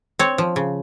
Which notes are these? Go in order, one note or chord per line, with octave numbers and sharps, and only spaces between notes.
C4 C#5
F3
C#3